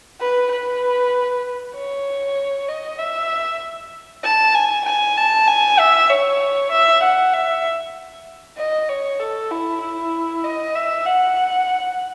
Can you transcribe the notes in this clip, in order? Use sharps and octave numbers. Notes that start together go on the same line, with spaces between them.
B4
B4
C#5
D#5
E5
A5
G#5
G#5
A5
G#5
E5
C#5
E5
F#5
E5
D#5
C#5
A4
E4
E4
D#5
E5
F#5